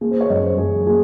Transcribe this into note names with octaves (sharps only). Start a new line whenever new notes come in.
A#3 G#4
C5
C#5
F#2 D#5
C5
F#2 G#4
A#3 G#4